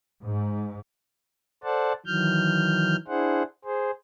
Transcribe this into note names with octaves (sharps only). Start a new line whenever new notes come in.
G#2
A4 C5 D5 F#5 A5
D#3 E3 F#3 F6 G6
D4 E4 G#4 C5 F#5
G#4 C5